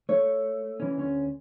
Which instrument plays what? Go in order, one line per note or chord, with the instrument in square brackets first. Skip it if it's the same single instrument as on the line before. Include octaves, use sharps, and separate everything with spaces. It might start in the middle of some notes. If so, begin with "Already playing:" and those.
[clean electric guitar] A3 [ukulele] C#5
[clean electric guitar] E3 C#4
D2 C#4